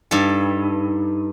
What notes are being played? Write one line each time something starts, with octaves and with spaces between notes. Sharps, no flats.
G2 D#4 A4